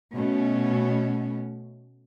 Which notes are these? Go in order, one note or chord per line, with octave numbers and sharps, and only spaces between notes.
B2 A3 C#4